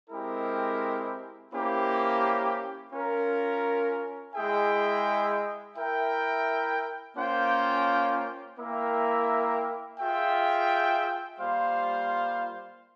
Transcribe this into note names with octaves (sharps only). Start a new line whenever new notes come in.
G#3 C4 E4 G4 A#4
A#3 C#4 E4 G4 C5
C#4 F4 A#4
G#3 E4 G#4 E5 G5
E4 A#4 E5 G5
A#3 C#4 F4 C5 G5
A#3 E4 A#4 E5 G5
F4 G#4 E5 G5
G3 A#3 F4 C5 F5